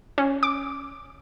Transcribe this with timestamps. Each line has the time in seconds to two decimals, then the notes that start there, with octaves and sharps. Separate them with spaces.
0.18 C#4
0.43 D6